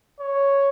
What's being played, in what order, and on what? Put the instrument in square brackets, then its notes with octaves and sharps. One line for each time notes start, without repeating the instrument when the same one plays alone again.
[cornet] C#5